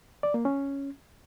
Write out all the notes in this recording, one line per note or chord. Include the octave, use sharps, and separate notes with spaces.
D5
A#3
C#4